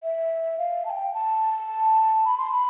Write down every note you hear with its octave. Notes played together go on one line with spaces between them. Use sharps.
E5
F5
A5
G5
A5
B5
C6
B5